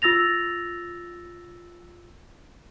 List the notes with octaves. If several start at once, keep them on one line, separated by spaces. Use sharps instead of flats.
F4 E6 A6 A#6 F7